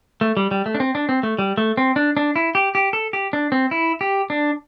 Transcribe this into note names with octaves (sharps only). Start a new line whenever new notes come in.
A3
G3
G3
A3
D4
C4
D4
C4
A3
G3
A3
C4
D4
D4
E4
G4
G4
A4
G4
D4
C4
E4
G4
D4